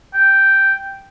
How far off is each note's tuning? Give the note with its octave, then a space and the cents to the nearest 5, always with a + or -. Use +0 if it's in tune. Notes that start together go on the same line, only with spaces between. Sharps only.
G5 -5